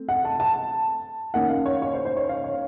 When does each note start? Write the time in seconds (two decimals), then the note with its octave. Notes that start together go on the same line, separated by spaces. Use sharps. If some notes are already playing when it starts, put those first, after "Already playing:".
Already playing: A3 C4
0.09 F#5
0.25 A5
0.40 A5
1.34 D#3 A#3 C#4 F#5
1.50 F5
1.66 C#5
1.82 C#5
1.94 C5
2.05 C5
2.17 C#5
2.29 F5
2.44 C#5